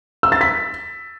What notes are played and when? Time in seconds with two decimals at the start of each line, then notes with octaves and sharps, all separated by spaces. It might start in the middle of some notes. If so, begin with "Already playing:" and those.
0.23 E6
0.32 A6
0.41 B6